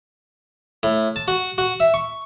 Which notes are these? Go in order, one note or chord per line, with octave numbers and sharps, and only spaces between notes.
A2
A5
F#4
F#4
E5
C#6